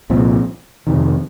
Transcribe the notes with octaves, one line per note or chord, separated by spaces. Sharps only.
C2 A#2 F3 C4
F2 C3 D#3